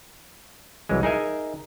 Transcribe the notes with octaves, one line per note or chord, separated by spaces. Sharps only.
C2 E3 F#3 G#3
D#4 G#4 A#4 E5 G#5